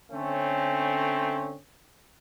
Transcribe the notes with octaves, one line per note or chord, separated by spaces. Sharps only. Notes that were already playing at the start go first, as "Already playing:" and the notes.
D3 A3 C4 C#4